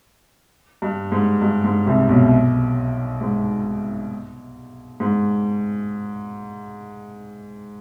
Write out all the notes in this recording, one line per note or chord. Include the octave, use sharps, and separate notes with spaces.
G2
G#2
G2
G#2
C2 C3
B1 B2
G#2
G#2